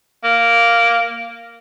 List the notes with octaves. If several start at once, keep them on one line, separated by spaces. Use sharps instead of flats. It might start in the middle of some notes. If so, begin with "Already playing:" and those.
A#3